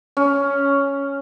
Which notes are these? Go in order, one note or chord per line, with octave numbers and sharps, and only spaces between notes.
C#4